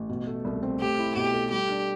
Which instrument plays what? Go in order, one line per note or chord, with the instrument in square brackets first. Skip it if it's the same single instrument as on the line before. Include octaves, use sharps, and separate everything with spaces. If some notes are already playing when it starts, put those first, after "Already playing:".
Already playing: [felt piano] A1
B2
A3
C2
C4
[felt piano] A3 [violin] G4
[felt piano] E4
[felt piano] B2 [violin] G4
[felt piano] A4
[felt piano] G3 [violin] G4
[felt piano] D4